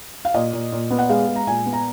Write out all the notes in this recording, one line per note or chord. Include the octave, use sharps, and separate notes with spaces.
F5
A#2 D#5
A#2
A#2
B3
F#5
G#3 F5
G#3
A#5
A#2 G#5
B3
A#5